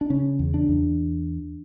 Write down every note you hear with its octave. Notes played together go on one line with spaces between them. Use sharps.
D4
C#3 C#4
E2
D4
E2